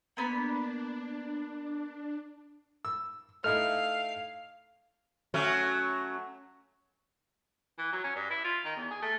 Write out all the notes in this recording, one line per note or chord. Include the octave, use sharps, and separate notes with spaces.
A#3 B3 D4 B5
E6
A3 D#4 E4 F5 F6
F#3 A3 C#4
E3
F#3
C#4
G2
E4
F4
D#3
E2
G#4
A3